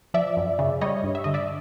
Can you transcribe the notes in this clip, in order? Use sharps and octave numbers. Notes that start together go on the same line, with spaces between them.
F3 D5 E5
F#2
C#3
G3 C#5 D#5
G2
E5
D3 D#5
D5 E5